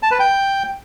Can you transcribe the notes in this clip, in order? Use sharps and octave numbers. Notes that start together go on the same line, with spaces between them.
A5
B4
G5